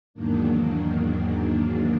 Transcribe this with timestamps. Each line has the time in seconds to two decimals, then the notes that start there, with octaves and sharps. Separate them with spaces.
0.14 E2 G#2 D#3 F#3 A#3 D4